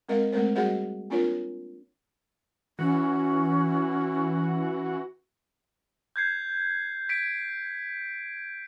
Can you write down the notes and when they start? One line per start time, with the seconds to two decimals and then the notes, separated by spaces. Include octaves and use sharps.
0.09 G#3 C4 A#4 D#5 F5
0.33 G#3 A3 C4 A#4 C5
0.56 G3 F#4 G#4 C5 D#5 F#5
1.10 A#3 C4 D4 F4 A#4 C#5
2.79 E3 C#4 F#4
6.16 G6 G#6 C7
7.09 B6 D7